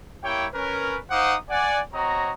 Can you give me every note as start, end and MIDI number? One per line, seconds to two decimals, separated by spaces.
0.24 0.47 58
0.24 0.47 64
0.24 0.47 67
0.24 0.47 73
0.24 0.47 79
0.53 0.98 61
0.53 0.98 70
0.53 0.98 71
1.10 1.35 63
1.10 1.35 72
1.10 1.35 77
1.10 1.35 78
1.10 1.35 86
1.10 1.35 87
1.50 1.80 74
1.50 1.80 78
1.50 1.80 80
1.94 2.33 60
1.94 2.33 66
1.94 2.33 73
1.94 2.33 75
1.94 2.33 82